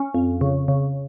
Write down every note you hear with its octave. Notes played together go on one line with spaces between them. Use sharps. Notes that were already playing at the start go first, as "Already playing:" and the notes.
Already playing: C#4
F2
C#3
C#3